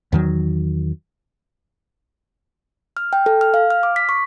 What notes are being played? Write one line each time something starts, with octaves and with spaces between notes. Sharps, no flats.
E2 D#3 F#3
F6
G5
A4
F6
F5
F6
D6
B6
C#6